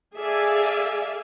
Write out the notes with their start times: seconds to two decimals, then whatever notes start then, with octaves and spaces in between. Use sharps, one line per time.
0.15 G#4 A4 D5 E5 F5 G#5